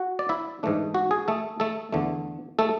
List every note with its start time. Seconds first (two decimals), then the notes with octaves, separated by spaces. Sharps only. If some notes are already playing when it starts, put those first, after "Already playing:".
Already playing: F#4 F#5
0.19 D5
0.29 E4 E5
0.63 G#2 E3 A3 D4
0.94 F#4
1.11 G#4
1.28 A3 A4
1.60 A3 A4
1.92 E2 D3 A3
2.59 A3 A4